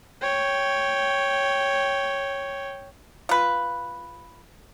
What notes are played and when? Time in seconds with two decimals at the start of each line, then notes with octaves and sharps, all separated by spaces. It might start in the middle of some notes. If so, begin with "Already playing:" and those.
0.21 C#5 G5
3.29 F4 B4